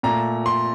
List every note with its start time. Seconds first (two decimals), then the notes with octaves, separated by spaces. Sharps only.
0.03 A#2 A3 A#5
0.46 C6